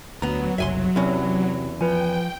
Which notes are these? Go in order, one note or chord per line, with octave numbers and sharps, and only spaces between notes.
D2 F#3 B3 A#5
F#1 C2 E5 G#5 C6
E2 C3 C#4 E4
F3 B4 G5 G#5